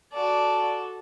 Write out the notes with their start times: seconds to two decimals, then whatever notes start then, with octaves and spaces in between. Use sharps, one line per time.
0.13 F#4 A4 D5